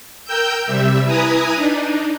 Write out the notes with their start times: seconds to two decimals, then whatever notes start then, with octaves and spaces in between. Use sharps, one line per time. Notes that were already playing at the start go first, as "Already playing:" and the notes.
0.24 A#4 G5 E6 G6
0.66 C3 G3 E5
1.04 E4 B4 G#5 A#5 D#6
1.55 D4 D#4